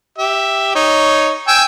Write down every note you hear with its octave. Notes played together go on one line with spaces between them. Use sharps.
G4 E5
D#4 C#5
G5 G#5 E6